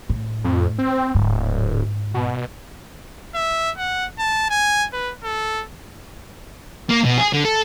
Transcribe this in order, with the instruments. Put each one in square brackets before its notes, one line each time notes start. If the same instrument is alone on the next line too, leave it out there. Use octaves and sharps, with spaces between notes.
[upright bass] A2
[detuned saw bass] F2
C4
[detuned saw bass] D1 [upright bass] G#2
[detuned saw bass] B2
[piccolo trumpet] E5
F#5
A5
G#5
B4
A4
[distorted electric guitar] A#3
B2
G#4
D3
A4